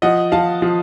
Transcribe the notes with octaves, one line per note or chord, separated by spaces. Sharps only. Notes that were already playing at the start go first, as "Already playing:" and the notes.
F3 D#5 F#5
F3 F5 A5
F3